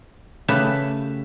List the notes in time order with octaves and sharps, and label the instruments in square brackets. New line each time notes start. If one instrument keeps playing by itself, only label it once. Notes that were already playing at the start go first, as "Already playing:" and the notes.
[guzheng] C#3 A3 G4 B4 B5